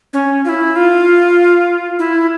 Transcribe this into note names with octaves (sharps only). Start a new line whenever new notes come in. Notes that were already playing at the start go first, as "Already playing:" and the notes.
C#4
F4
E4
F4
E4